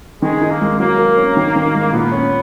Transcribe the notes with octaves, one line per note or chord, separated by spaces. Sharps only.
D#3 G#3
D#4
A#3
G#3
F#3 A#3
A#4
C#4
D#3
D#3
G#3
A#2 B3
C#4